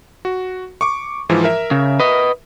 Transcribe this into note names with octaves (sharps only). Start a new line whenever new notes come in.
F#4
C#6 D6
G#2 E3 F3
A#4 E5
C#3
B4 D#5